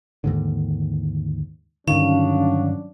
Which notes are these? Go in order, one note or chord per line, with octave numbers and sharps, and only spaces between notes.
D#2 G#2 D3
G2 D3 D#3 F#3 C#4 D4 F5